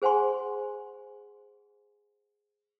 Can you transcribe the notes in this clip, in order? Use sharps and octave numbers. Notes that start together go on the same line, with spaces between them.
G#4 C5 F#5 G#5 C6